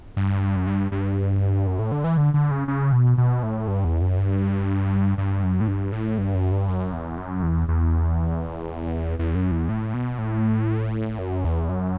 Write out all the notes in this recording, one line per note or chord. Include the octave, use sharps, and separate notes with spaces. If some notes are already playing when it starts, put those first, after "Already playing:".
G2
F#2
G2
G2
F#2
A2
D3
E3
D3
D3
C#3
C#3
B2
B2
A2
G2
E2
F#2
G2
G2
F#2
A2
G2
A2
G2
F#2
G2
F#2
E2
F#2
E2
E2
E2
F#2
E2
A2
B2
A2
F#2
E2
F#2